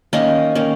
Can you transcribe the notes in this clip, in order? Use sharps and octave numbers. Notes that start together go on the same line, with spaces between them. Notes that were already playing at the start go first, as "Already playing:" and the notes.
D#3 A#3 C#4 D#5
D#3 A#3 C#4